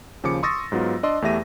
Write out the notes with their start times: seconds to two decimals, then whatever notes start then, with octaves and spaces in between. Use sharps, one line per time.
0.23 D#2 C#3 F3 D6 C#7
0.43 C6 C#6 D#6 E6 A6 A#6
0.72 G#2 F#3 B3 F4
1.03 D4 D5 D#5 C6 E6
1.22 E2 A3 G4 E5 A#6 D#7